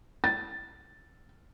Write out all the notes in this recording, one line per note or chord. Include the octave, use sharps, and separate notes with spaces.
A6